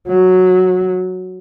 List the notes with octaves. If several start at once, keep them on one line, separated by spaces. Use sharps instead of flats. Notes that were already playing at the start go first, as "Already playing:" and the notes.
F#3